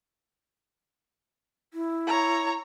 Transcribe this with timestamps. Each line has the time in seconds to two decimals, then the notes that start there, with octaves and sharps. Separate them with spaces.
1.74 E4
2.07 C#5 A#5